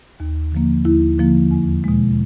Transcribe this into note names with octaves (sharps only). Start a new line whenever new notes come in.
D#2
D3 F3 A#3
D#2 E4
D3 F3 A#3
E2
B2 G#3